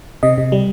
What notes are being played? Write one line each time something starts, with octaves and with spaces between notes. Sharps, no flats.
C3 D#5
C3
G3